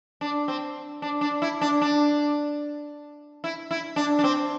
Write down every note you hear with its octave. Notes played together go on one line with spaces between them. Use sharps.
D4
C4
D4
D4
E4
D4
D4
E4
E4
D4
D4
C4